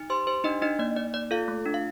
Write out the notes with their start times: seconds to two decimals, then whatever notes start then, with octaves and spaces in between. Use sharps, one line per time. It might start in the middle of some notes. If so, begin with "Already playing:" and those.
Already playing: D#4
0.10 G4 C5 C6
0.27 G4 C5 C6
0.44 D4 D#4 D#5
0.62 D4 D#4 D#5
0.79 A#3 D5
0.96 D#4 D5
1.14 A#3 D5
1.31 F4 A4 F5
1.48 A3
1.66 D4
1.74 F5